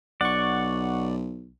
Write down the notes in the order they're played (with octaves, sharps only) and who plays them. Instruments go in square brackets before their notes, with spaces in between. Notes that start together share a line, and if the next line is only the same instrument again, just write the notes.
[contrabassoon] B1 [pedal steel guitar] D5 [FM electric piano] F#5 C#6